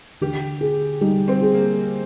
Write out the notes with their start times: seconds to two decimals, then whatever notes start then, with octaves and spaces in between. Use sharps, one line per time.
0.21 D3 G4
0.61 G#4
1.01 G3 D#4
1.28 C4
1.42 G#4
1.54 A#3